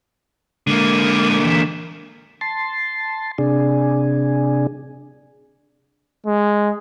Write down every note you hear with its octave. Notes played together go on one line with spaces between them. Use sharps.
D3 G#3 A#3
E3
A5 C6
C3 D4 G#4
G#3